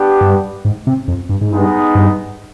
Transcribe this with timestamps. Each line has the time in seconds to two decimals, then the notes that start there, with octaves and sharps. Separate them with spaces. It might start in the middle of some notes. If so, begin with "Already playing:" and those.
Already playing: B3 D4 G4
0.21 G2
0.65 G#2
0.87 C3
1.08 F2
1.29 G2
1.41 G#2
1.51 G2 G#3 B3 D#4
1.95 G2